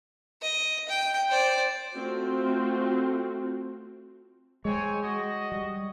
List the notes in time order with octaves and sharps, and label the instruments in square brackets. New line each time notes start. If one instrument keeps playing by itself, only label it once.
[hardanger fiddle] D#5
G5
C5 D5
[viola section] A3 C4 F4 F#4
[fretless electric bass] G#3 [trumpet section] C4 C#5 G#5
[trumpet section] F#4 D#5
[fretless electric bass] G3